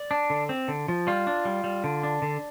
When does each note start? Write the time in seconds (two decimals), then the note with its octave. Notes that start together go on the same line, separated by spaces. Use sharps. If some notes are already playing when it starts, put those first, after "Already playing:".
Already playing: D5
0.11 D4
0.30 D3
0.49 C4
0.68 D3
0.88 F3
1.07 G3 F4
1.27 D4
1.45 G3
1.64 G3
1.84 D3
2.03 D4
2.22 D3